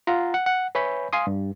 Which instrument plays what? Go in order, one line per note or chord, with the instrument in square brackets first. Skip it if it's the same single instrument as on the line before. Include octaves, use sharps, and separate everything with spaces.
[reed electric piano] F4 F#5 A#5
F#5
F#5
B4 C#5 E5 G#5 B5 G6
F5 G#5 C6 D#6
G2